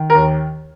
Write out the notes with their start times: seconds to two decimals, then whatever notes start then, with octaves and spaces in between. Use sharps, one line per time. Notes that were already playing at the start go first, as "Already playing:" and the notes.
Already playing: D#3
0.10 D#2 A#4